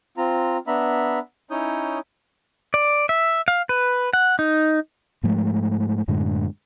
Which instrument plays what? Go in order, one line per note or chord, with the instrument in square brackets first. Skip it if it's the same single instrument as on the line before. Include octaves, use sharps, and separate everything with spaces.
[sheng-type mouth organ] C4 F4 A#5
B3 D4 E5 A#5 B5
C#4 D#4 E4 C#5 D#6 G6
[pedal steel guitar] D5
E5
F5
B4
F#5
D#4
[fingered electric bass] G#2 F3 G#3 A3
F#2 A2 D3 G#3